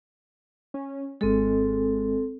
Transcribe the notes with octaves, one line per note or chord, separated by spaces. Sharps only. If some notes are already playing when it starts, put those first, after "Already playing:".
C#4
G#1 G#3 C4 A4